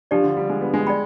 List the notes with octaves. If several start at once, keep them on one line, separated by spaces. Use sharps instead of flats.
F3 D4 G4 D5
D3
G3
G#3
B3
G#3
D5 G5 B5